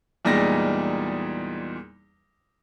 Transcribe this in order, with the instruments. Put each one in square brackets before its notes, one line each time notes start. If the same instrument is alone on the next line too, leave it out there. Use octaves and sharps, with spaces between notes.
[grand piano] E2 A#2 G3 G#3 D#4 A#6